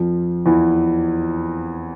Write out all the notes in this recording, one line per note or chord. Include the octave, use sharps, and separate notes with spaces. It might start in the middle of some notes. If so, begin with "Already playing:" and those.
Already playing: F2 F3
E2 E3